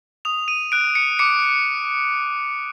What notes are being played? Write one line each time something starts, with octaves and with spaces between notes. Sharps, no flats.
D#6 F7
D#7
F#6 D7
C#7
D6 C#7